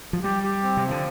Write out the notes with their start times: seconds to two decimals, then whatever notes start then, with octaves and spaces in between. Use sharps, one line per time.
0.13 F3
0.23 G3 G4
0.43 G4
0.63 C4
0.77 C3
0.84 F3
0.91 D3